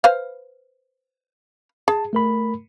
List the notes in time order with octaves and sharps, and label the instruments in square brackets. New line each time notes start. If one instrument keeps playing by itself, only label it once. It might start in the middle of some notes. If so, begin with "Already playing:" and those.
[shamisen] B4 C5 F5
[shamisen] G#4 [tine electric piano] A5
[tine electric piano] A3 A#4 B5